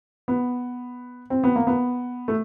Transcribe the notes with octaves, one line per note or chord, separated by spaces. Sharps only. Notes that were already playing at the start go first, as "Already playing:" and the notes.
B3
C4
B3
A#3
B3
A3